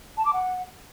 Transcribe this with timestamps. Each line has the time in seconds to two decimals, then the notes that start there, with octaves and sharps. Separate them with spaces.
0.17 A5
0.25 D6
0.33 F#5